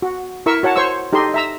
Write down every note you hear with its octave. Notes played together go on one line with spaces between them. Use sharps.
F#4
E4 A#4 E5 C#6 E6
F#4 C#5 F#5 A5
C5 C#5 C#6 E6
D#4 G4 A4 D#5 C6
E5 A#5 E6